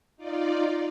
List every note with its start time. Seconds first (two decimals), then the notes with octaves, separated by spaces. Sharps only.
0.17 D#4 F4 D5